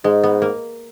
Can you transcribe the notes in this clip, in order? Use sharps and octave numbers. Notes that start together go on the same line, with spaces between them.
G#2 G#3
B3
A#3